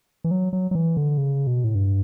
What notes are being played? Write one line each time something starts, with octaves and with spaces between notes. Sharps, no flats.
E3
F#3
F#3
F#3
E3
D3
C#3
B2
A2
G2